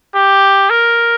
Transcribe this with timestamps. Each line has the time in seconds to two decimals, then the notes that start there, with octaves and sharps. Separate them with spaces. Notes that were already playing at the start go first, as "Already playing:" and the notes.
0.16 G4
0.70 A#4